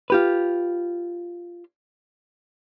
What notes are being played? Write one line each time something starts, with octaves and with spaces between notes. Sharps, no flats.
F4 G4 B4